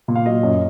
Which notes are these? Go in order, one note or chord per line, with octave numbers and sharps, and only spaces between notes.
A#2
F5
F#3 D#5
F#2